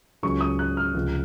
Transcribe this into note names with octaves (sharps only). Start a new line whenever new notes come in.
C#2 C#3 F#3 C#4 C#6
D#6
F#6
F6
C#2 C3 F3